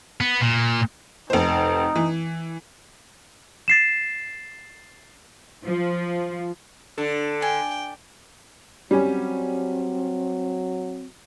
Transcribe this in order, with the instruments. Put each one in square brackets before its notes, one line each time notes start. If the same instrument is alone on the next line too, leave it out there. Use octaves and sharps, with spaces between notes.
[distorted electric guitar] B3
A#2
[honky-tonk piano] F1 C5 [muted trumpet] D#4
[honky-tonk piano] E3
[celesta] A6 C7 E7
[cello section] F3
[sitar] D3 [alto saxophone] A4
[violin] G5 [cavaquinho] G#5
[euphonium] F#3 [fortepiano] G3 C#4 [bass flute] C4